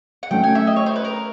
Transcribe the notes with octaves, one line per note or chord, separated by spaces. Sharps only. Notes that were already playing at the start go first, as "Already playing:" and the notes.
F#5
F#3 A3 C#4 G5
G#5
E5
D#5
C#5
C5
B4
A#4